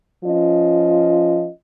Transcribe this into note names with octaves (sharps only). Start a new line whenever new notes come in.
F3 C#4 F4 D#5